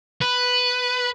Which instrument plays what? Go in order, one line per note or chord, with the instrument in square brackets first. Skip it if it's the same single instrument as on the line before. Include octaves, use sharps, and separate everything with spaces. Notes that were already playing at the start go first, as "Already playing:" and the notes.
[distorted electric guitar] B4